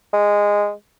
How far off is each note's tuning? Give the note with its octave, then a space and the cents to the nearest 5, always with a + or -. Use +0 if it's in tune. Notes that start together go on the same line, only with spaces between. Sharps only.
G#3 -10